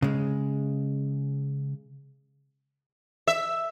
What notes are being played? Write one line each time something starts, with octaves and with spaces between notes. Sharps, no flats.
C#3 G#3
E5